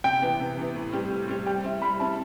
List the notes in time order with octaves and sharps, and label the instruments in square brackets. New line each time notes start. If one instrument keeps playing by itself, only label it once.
[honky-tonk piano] C3 [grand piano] G5
[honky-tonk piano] E3 B3
C3
E3 B3
A2
G3 C4 G4
A2
G3 C4 G4
[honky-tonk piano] G3 [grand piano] G5
[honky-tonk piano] C4 E4
[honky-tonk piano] G3 [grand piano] B5
[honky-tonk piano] C4 E4 [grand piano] A5